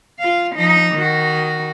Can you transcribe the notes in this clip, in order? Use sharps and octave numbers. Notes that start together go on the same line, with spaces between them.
F4 F5
F3 D#4
D#3 F#4